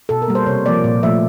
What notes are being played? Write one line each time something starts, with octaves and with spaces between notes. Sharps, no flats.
B2 A4
A#4
G3 A#3
C5
C3 C#5
F3 A#3 D5
A#2
F3 A3 E5